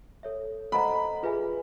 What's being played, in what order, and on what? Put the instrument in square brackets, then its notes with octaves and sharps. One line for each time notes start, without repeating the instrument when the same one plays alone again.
[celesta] A4 C#5 E5
[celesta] A4 C5 D#5 F#5 A#5 [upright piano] B5
[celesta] F4 G#4 B4 E5 G#5